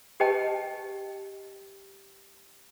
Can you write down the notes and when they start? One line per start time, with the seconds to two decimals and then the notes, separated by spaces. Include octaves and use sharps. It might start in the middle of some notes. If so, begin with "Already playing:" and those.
0.20 G4 B4 D#5 G5 A5